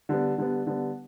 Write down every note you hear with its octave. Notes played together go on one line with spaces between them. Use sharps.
D3 G3 B3
D3 G3 B3
D3 G3 B3